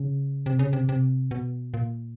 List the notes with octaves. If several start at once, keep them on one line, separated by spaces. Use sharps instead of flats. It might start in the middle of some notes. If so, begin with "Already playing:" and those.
Already playing: C#3
C3
C#3
C3
C3
B2
A#2